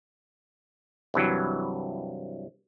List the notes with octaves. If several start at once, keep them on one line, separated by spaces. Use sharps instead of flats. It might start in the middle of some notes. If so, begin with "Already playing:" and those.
C2 G2 E3 F#3